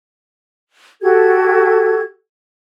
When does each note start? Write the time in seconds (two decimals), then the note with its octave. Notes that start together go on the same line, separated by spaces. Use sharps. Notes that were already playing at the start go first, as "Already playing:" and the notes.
1.02 F#4 G4 A4 G#6